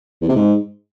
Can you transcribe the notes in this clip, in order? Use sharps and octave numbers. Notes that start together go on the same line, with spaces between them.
E2
C3
G#2